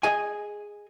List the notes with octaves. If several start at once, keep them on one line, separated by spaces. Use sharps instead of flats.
G#4 D#5 G#5